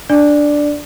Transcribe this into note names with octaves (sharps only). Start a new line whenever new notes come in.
D4 D5